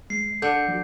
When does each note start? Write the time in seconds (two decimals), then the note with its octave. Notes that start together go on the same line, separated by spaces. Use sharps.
0.10 G#3 C7
0.42 D3 A4 G6 C#7
0.68 F3 F#4